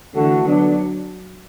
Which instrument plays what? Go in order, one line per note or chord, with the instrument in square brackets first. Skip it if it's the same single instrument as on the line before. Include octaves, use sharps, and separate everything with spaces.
[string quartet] D3 [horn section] E3 A3 F#4 A4
[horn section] D3 B3 D4 [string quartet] F#3